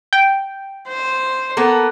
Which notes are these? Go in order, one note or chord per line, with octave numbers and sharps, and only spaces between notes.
G5
C5
A#3 B3 A4